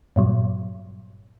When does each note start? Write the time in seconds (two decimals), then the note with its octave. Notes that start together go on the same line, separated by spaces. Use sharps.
0.16 G2 A#2 F#3 G3